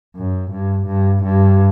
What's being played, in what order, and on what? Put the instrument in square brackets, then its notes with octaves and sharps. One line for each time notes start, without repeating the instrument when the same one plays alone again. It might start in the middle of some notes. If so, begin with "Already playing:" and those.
[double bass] F#2
G2
G2
G2